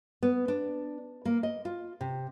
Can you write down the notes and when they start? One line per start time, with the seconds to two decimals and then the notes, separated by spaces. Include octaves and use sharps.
0.23 B3
0.48 D4
1.25 A#3
1.43 D#5
1.65 F4
2.01 C3